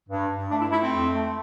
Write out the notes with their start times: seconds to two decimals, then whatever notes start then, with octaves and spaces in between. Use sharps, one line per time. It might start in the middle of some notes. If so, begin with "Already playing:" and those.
0.08 G2
0.29 G2
0.50 A3 D4
0.60 E4
0.70 A3 E4
0.80 C4
0.91 F2
1.12 A3